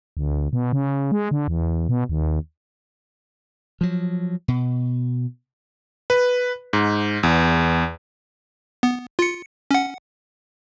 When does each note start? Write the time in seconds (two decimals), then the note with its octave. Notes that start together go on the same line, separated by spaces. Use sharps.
0.17 D2
0.53 B2
0.73 C#3
1.12 G#3
1.31 D3
1.48 E2
1.89 B2
2.09 D#2
3.81 F3 F#3
4.48 B2
6.10 B4
6.73 G#2
7.23 E2
8.83 B3
9.19 F4 C#7
9.71 C#4 F#5